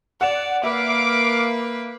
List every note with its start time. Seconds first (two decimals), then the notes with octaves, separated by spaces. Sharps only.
0.21 D5 F#5 E7
0.64 A#3 B4 E5 F5 D6